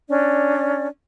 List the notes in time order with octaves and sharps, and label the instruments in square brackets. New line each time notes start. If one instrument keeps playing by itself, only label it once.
[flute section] C#4 D4 D5